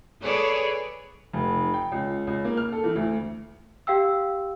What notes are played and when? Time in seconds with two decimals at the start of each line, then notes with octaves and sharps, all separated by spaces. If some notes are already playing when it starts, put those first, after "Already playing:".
0.22 G#4 A4 B4 C#5 D5
1.33 F1
1.74 G5
1.92 C#2
2.27 C#2
2.45 A#3
2.57 F6
2.72 A4
2.84 E3
2.96 D2
3.87 G4 F5 G5 E6